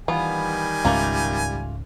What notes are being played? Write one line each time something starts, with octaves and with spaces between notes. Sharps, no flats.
D#3 E3 G3 B3 F4 G#5
C#2 G#2 A3 A#3 C#4 F4